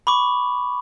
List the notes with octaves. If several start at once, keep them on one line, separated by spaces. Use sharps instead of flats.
B5 C#6 D6